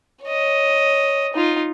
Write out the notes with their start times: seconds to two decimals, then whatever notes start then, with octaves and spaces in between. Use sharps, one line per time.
0.25 C#5 D#5
1.34 D#4 F4